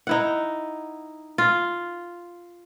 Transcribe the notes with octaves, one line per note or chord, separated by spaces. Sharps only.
D#4 E4 F#5
F4